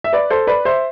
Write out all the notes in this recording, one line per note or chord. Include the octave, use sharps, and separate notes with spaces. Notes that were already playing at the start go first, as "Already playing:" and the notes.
E5
B4 D5
A4 C5
B4 D5
C5 E5